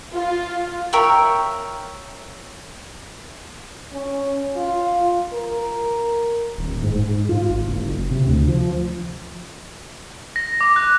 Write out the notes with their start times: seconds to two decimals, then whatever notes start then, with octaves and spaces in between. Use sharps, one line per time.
0.13 F4
0.93 A#4 C#5 E5 G5
3.94 C#4
4.57 F4
5.33 A#4
6.58 D#1
6.83 G#2
6.95 G#2
7.29 F4
7.50 G#1
7.68 F#1
8.11 C3
8.26 D2
8.48 F3
10.36 A#6
10.61 D6
10.76 F#6